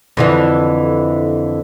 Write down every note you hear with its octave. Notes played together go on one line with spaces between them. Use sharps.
F2 D3 E3